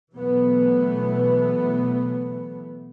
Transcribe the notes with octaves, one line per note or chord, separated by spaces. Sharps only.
B2 E3 F#3 A3 B3